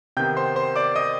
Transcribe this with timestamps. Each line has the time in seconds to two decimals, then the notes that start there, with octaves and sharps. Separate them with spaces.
0.17 C3 D#3 B3 G5 G6
0.37 C5 C6
0.56 C5 C6
0.76 D5 D6
0.96 D#5 D#6